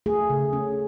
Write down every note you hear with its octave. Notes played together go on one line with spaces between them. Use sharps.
A3 G#4
C#3
C#4